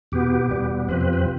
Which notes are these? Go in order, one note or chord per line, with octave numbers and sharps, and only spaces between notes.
E2 B2 B3 G4
E2 B2 G3 B3
F2 C3 F3 C4 B4
B4
B4